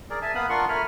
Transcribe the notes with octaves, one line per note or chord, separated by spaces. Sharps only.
G#4 A#4 D5
E5 G#5 A5
A#3 B3 B4 F5 D#6 F#6
D4 F4 A#4 F#5 C6 C#6
A3 A#4 G#5 B5 F6